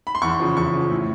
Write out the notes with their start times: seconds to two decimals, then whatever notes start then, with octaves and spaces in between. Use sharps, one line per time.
0.07 B5
0.15 C6
0.22 E2 C#6
0.40 C#3 F3
0.57 E2 C#6
0.74 C#3 F3
0.91 A2